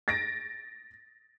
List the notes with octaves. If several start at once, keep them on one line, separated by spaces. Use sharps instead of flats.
A6 A#6 D7